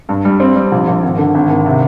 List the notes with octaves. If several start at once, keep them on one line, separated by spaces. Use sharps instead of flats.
G2
G3
C4
G3
A#1
A#1
G#1
D3
G#1
G#1
C3